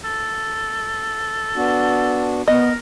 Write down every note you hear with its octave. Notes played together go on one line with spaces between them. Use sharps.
A4
B3 D4 F#4
B3 A#4 D#5